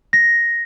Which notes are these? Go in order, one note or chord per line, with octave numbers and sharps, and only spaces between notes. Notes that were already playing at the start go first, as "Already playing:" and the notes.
A#6